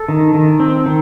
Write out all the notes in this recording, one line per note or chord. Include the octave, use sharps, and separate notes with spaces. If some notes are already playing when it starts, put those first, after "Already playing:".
Already playing: A4
D#3
D#3
C4
D#3